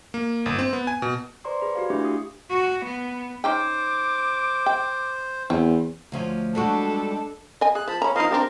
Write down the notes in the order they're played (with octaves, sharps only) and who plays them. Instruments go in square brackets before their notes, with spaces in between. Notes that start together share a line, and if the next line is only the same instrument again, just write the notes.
[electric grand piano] A#3
G1
C4
B3
G#5
B2
[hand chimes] B4 C5 D5 A#5 C6 C#6
G#4 B4 B5
F#4 G4 F5
A3 D4 E4 G4 E5 C#6
D#6 C7
[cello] F#4
B3
[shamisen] C#4 D#4 G5 [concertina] C5 [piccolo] D6
[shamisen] G5
[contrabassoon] E2 [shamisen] C4 C#5
[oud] D2 F3 C#4
[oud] G3 G#3 F#4 [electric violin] D4 A4
[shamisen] D#5 G#5
[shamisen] G#4 [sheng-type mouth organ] F#6
[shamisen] F3 [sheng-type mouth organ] A5 B5
[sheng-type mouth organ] C#4 [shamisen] A#5 B5
[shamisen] F3 D#4 [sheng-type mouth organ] A#4 D#5 F5
[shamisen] C4 D4 G4 [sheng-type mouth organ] A#4